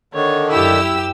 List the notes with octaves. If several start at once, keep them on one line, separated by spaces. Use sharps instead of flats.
D3 D#3 C#5
F#2 E4 G4 E6